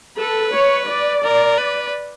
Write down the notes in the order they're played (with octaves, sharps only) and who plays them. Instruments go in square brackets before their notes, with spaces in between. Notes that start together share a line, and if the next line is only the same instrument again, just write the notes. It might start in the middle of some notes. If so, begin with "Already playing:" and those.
[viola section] A4 [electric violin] B4
[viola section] C#5
D5
[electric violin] A#4
B4